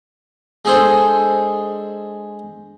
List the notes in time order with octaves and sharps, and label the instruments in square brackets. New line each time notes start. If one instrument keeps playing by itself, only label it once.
[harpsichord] G#3 D4 G#4 A4 C5